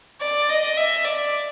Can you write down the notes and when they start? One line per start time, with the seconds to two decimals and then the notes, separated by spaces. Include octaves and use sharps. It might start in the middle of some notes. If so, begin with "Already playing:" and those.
0.21 D5
0.49 D#5
0.77 E5
1.05 D5